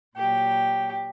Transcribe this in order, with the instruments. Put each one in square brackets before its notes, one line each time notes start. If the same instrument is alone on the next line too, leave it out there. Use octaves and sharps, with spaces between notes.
[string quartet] A#2 F#3 G4